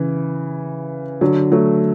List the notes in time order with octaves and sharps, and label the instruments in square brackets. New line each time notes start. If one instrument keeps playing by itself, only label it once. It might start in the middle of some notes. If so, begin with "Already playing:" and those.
Already playing: [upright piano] C#3 E3
D3 F#3
F#3 A3